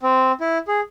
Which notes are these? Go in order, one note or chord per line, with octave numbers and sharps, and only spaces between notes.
C4
E4
G#4